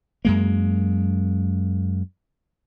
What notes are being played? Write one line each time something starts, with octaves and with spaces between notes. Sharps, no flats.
F#2 G#3 A#3